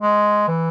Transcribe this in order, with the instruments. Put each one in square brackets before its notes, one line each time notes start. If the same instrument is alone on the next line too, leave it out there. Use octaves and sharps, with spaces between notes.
[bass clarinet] G#3
E3